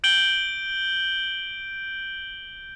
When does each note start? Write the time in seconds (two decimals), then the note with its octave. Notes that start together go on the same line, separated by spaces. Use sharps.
0.04 G6 D7 F#7 G7